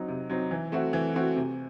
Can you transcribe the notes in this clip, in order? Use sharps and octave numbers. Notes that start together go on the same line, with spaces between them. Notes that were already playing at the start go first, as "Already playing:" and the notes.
Already playing: F#3 C4 D#4
C3
F#3 C4 D#4
E3
A3 C4 F#4
E3
A3 C4 F#4
C3